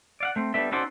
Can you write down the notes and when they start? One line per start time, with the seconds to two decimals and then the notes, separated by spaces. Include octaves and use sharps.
0.20 D5 F5 F#5
0.36 A3 C4
0.54 G3 B3 D4 A4 E5
0.72 C#4 D#4 F#4 A4 C5 D5